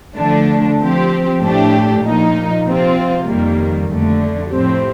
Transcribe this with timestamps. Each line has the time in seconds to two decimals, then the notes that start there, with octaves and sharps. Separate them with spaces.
0.17 D3 F3 A3 D4
0.79 F3 C4 G4
1.42 A2 A3 D4 G4
2.03 A#2 F3 A#3 D#4
2.65 C3 F3 C4 F4
3.27 F2 D#3 G3 A#3
3.89 F2 D3 A3
4.50 A2 F3 C4 G4